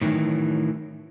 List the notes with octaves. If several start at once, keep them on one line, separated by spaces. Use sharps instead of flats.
A2 D#3 E3 F#3